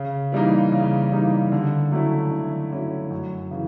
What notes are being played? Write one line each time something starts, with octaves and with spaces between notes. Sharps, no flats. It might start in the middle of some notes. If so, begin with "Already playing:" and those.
Already playing: C#3
E3 G3 A#3 D#4
C#3
E3 G3 A#3 D#4
D3
F#3 A3 C#4 E4
D3
F#3 A3 C#4 E4
F#2
C#3 E3